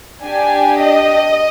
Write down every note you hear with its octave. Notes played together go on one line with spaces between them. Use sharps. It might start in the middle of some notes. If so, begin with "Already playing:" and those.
D4 G4 G#5
D#5